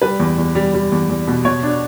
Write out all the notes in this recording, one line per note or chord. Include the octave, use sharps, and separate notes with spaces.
G3 B4
E2
E2
G3
G3
E2
E2
B2
B2 C#5
D4